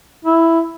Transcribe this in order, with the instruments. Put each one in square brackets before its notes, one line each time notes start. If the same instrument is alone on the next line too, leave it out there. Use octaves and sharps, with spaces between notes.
[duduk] E4